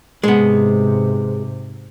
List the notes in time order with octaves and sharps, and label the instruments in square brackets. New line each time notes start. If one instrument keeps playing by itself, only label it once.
[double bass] G#2 C3 [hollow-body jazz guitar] G#3 B3